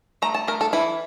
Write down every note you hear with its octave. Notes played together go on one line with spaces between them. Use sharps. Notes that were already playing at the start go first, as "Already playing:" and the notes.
A3 A#5
A5
A3 A#4
A4
E3 E4